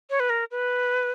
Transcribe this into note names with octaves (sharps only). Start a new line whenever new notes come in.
C#5
B4
A#4
B4